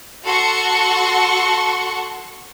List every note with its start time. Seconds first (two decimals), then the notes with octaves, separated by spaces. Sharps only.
0.24 F#4 A4 F#5 C6 C#6